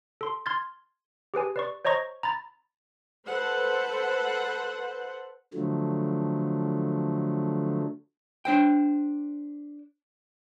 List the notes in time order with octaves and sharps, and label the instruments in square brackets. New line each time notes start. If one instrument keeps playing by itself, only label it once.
[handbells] A4 C6
C6 F6 G#6 A6
G4 G#4 B4 G#5
B4 D5 C#6
C5 C#5 D#5 A#5 C#6 A#6
A#5 B5 A6
[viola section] A4 B4 C5 F#5
[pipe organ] D3 F3 F#3 A3
[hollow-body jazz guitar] D4 C5 G5